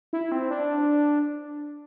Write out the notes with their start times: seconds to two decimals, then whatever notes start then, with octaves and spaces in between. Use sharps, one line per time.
0.13 E4
0.32 C4
0.50 D4